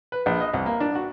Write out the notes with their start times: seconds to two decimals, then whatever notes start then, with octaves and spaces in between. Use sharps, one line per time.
0.12 B4
0.26 A#1
0.41 D#5
0.54 C2
0.66 A#3
0.80 D4
0.95 F#4